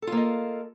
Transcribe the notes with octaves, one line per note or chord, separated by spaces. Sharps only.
A#3 F4 A4 D#5